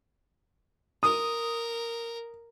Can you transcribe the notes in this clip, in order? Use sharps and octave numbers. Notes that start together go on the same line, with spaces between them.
A#4 D#6